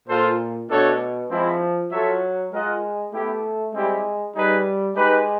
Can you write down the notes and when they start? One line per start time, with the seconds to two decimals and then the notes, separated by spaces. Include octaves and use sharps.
0.08 A#2 F4 A4 C5
0.69 B2 A3 D4 F#4 A4 C#5
1.30 F3 G#3 C4 E4
1.91 F#3 F4 A4 C#5 E5
2.52 G#3 F4 A#4 D#5 F#5
3.12 A3 B3 E4 G4
3.73 G3 G#3 C4 E4 G4
4.34 G3 D#4 G#4 B4
4.95 G#3 D#4 G4 B4